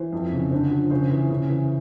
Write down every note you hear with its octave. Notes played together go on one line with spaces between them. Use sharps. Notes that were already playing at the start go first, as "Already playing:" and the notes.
Already playing: E3 C5
F2
C#3
D3 C5
F3
C#3 C5
E3
C#3
E3